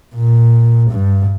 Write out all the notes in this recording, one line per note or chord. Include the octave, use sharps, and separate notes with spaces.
A#2
G2